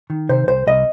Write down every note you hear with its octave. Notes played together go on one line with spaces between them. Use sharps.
D#3
C3 C5
C2 C5
C2 D#5